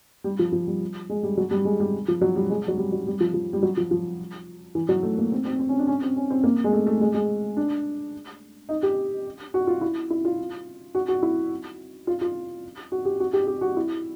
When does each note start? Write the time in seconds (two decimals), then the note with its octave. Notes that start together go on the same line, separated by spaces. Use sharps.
0.24 G3
0.39 F3
0.52 F3
0.67 G3
1.10 G#3
1.23 G3
1.37 F#3
1.51 G3
1.65 G#3
1.80 G3
2.08 F3
2.21 F#3
2.36 G3
2.50 G#3
2.68 F#3
2.78 G3
2.92 F#3
3.07 G3
3.20 F3
3.34 F3
3.53 G3
3.63 F#3
3.77 F3
3.91 F3
4.75 E3
4.89 F#3
5.03 A3
5.18 A#3
5.32 C4
5.45 C4
5.59 C4
5.69 C#4
5.78 D4
5.87 C#4
6.03 C4
6.17 C#4
6.30 C4
6.44 A#3
6.64 G#3
6.73 A3
6.87 A3
7.01 G#3
7.14 G#3
7.57 D4
8.69 D#4
8.83 G4
9.54 F#4
9.67 F4
9.81 E4
10.10 E4
10.25 F4
10.95 F#4
11.08 F#4
11.23 E4
12.07 F4
12.21 F4
12.92 F#4
13.05 G4
13.20 F#4
13.33 G4
13.47 G4
13.61 F#4
13.77 E4